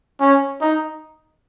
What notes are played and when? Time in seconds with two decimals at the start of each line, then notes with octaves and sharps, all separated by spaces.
0.20 C#4
0.61 D#4